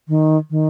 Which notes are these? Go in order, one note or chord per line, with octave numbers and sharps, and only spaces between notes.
D#3
D#3